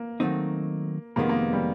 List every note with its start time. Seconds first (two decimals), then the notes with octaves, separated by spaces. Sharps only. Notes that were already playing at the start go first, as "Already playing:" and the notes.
Already playing: A#3
0.20 D#3 F#3 A3 C4 D#4
1.16 F2 C3 D#3 G#3 A#3 B3
1.29 A#3
1.53 G3